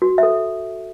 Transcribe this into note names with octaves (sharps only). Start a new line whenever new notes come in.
F#4
A4 E5